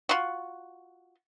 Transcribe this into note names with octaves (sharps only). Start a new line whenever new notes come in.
F4 F#4